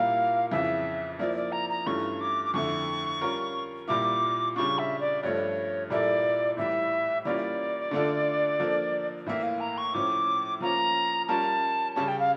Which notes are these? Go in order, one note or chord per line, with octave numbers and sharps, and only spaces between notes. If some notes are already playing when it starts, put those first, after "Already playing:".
Already playing: A#2 G3 A#3 E4 A#4 F5
F2 C#3 E3 E5
F3 A#3 E4 D5
D5
A#5
A#5
G2 E3 A3 C#4 F4 C#6
D6
D6
F2 D3 A3 E4 C#6
G3 C#4 F4 A#4
A#2 G3 A#3 E4 D6
C#3 G3 D4 F4 C#6
E5
D5
G2 F3 A3 C#5
A#2 G3 A#3 E4 A4 D5
A2 E3 G3 E5
E3 G3 A#3 C#4 F4 D5
D3 A3 D4 F4 A4
F3 A#3 D4 A4
A2 E3 A#3 E5
F5
A#5
C#6
A2 F3 C#4 D6
F3 A#3 C#4 F4 A#5
G3 C#4 F4 A#4 C#5 A5
C#3 G3 C#4 A5
G5
F5